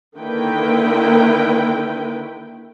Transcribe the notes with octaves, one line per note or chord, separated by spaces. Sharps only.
D3 D#3 A#3 E4 B4 G5